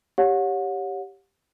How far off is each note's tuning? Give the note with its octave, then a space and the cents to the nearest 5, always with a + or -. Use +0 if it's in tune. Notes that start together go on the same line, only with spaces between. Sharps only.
G4 +0 C#5 +0 F#5 -35